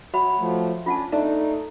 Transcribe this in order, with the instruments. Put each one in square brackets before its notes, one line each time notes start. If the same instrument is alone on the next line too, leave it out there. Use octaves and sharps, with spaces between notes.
[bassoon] F#3 [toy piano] F#4 E5 B5
[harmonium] F3 A3
[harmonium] C#4 D4 [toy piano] F4 F#5 A5
[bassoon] A3 [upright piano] D4 [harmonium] D#4